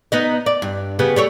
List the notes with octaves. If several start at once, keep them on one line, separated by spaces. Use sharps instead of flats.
B3 D#4 D#5
D5
G2
C#3 B3 G4
G3 A3 C#5